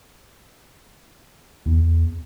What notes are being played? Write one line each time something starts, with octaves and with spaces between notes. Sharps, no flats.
E2